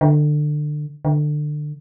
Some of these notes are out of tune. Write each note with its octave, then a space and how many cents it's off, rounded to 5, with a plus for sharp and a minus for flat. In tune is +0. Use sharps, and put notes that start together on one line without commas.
D3 +25
D3 +25